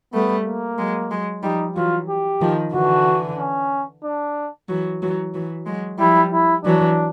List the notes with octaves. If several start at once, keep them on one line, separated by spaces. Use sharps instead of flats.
G3 A3 B3
A#3
F#3 G#3
F#3 G#3
F3 G3 D#4
E3 F#3 F4
G4
D#3 F3
D3 E3 F#4
C#4
D4
E3 F#3
E3 F#3
E3 F#3
F#3 G#3
F3 G3 E4
E4
E3 F#3 D4